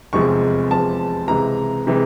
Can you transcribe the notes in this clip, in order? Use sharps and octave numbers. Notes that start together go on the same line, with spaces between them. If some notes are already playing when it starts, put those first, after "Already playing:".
F1 E2 C3 F3 G#3 C#6
F1 E2 C3 F3 G#3 A5
C#2 C3 E3 G#3 A#5
C3 E3 G#3